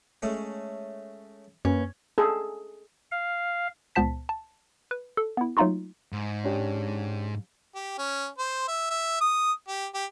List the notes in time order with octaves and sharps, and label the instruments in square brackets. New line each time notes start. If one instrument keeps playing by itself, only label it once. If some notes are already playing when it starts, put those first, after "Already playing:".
[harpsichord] G#3 A3 C#4
[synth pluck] F#2 [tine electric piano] A#3 B4 [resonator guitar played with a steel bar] C#4
[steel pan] G#4 A4
[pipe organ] F5
[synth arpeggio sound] C#2 A#2 B3 C5 A5 B6
A5
B4
A4
B3 E4
F#3 A3 A#3 D#4 F4 F#4
[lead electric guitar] G#2
[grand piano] C#4 D4 G4
[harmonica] G4
C#4
C5
E5
E5
D#6
G4
G4